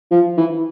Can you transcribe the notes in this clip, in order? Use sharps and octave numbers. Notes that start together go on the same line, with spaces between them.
F3
E3